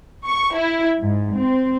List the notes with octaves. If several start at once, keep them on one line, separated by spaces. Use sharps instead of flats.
C#6
E4
G#2
C4